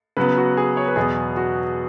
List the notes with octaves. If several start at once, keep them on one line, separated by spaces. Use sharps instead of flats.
C#3 F#3 B3 B4
F#4
G#4
C#5
B4
E2 B2 F#3 B3 G#4
F#4